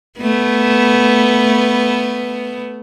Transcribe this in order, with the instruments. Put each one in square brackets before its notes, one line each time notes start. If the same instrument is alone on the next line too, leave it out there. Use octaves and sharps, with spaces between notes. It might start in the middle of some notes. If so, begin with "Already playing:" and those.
[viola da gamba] A3 B3